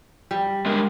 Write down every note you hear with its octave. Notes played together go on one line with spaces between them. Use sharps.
G3
G#3 D4 A#4